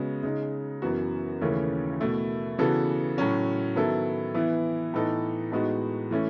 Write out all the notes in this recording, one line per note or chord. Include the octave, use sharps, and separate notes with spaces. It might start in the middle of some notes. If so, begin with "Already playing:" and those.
Already playing: C#3 G#3 B3 F#4
C#3 G#3 D#4
F#2 E3 B3 F#4
D#2 C#3 E3 A3 C#4
B2 A3 E4
C#3 E3 B3 F#4 A4
A2 F#3 C#4 F#4
D#3 F#3 B3 E4 A4
E3 B3 E4
A2 E3 B3 D#4 A4
A2 G#3 B3 D#4 F#4
E3 A3 C#4